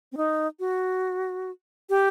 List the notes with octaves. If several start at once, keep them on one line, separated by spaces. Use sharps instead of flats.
C4
D#4
F#4
G4